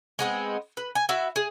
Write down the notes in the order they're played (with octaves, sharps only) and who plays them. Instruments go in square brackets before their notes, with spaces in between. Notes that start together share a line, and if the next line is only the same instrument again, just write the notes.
[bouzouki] G#3 B3 C4
B4
G#5
E4 F#4 E5
G#4